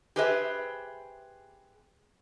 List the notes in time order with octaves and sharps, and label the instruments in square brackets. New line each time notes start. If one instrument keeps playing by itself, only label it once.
[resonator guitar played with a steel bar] G4 G#4 B4 C5 D#5 E5